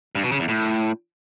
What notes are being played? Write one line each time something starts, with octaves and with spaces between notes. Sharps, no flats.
G2
B2
C#3
E2
A2